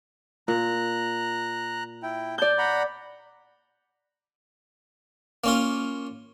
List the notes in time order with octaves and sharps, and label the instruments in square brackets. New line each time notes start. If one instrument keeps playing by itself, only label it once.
[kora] A#2 [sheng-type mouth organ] A#5 F#6
[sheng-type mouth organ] E4 G5
[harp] D5 G6 [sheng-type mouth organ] A5
[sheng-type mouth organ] F#5 A#5 B5
[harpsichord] A#3 C#4 F4